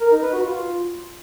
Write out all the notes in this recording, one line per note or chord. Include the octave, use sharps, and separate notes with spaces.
A#4
D#4
B4
F#4
F4